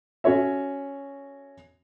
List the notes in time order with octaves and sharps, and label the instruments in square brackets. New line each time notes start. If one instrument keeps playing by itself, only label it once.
[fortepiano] C#4 F#4 A4 C#5 E5